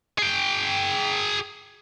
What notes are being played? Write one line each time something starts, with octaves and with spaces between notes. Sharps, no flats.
G#4 G5